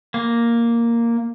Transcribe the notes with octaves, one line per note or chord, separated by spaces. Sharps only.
A#3